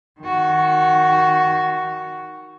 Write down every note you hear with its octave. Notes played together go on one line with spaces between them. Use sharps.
D#3 F#4